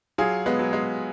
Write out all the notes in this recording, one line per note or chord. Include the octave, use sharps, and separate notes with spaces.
F#3 F4 G#4
G#3 B3
F#3
G#3